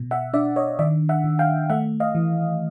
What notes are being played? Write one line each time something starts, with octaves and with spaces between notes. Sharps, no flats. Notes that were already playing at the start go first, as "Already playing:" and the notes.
Already playing: B2
E5 F#5
D4 D5 E5
C#5 D#5
D#3 D5 E5
E5 F#5
D#3
F5 G5
A3 E5 F#5
D#5 F5
E3